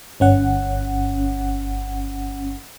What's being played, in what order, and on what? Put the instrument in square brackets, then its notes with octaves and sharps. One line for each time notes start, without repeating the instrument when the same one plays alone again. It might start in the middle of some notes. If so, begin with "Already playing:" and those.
[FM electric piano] G1 C#4 F#5